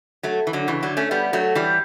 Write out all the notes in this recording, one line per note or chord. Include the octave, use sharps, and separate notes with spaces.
F#3 A3
E3
D3 F#3
C#3 E3
D3 F#3
A3 C#4
G3 B3
F#3 A3
E3 G3